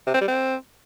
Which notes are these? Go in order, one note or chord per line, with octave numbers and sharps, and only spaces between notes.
C3
C4
G3
C4